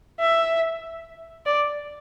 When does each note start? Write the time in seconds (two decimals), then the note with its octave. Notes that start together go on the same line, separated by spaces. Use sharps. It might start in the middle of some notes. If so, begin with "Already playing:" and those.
0.20 E5
1.46 D5